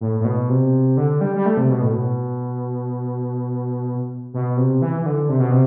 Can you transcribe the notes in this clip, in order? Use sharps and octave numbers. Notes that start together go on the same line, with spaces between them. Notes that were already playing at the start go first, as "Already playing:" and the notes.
A2
A2
B2
C3
D3
G3
G3
A3
C3
B2
A2
B2
B2
C3
E3
E3
D3
C3
B2
C3